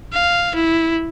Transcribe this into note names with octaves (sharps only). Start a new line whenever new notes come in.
F5
E4